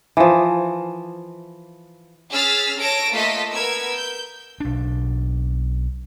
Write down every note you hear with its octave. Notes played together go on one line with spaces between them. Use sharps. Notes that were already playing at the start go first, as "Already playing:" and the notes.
E3 F3
C#4 G#4 E6 F6 A6 B6
A4 C#5 A#6 D7
A3 A#3 F4 A4 D#5 B6
B3 A#4 E6 G#6
G6
B1 D4